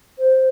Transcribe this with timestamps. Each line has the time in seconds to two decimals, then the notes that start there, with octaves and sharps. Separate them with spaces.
0.19 C5